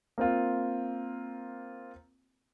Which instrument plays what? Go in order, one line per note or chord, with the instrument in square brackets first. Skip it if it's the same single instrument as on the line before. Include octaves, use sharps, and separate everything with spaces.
[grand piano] A#3 C4 F4